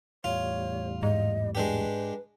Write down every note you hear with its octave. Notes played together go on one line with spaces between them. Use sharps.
E2 A2 G3 F4 C#5
G#2 D#5
G#3 D4 G4 B4